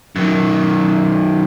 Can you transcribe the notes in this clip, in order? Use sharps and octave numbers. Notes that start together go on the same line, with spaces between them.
F#2 D#3